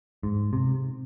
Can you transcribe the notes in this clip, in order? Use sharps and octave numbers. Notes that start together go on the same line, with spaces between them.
G#2
C3